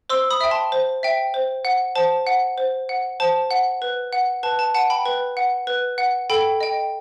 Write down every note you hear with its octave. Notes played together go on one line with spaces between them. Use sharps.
C5 C6 E6
B5 D#6
E5 G5
A5 C6
C5
E5 G5
C5
F#5
C5 A5
F#5
C5
F#5
C5 A5
F#5
B4
F#5
B4 A5
A5
F#5 A5
G5 B5
B4
F#5
B4
F#5
A4 G5 B5
D#5 G5